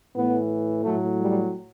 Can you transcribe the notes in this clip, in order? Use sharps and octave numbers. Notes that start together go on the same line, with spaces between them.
A2 E3 B3
A2 F#3 A3
G3